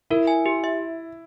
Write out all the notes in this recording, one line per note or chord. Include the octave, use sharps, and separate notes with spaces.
E4 A#4
G#5
G4
E5